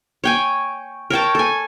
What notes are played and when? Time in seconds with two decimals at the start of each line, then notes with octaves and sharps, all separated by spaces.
0.24 C#5 G5 G#5
1.10 A#4 C#5 G5 A5
1.35 A4 G#5